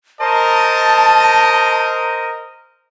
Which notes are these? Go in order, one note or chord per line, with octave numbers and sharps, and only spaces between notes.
A#4 C5 D#5 A5